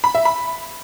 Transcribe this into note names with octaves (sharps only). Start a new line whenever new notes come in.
B5
E5
B5